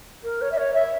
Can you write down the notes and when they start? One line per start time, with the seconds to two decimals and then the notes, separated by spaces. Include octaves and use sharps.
0.24 A#4
0.42 C#5
0.52 E5
0.58 C#5
0.74 E5